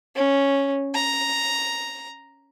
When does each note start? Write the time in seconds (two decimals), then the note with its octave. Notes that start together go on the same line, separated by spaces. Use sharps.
0.16 C#4
0.94 A#5